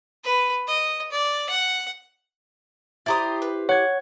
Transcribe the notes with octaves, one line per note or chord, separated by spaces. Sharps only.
B4
D#5
D5
F#5
E4 G4 C5 D5 A#5 D#6
B4
C#5 F#5 G#6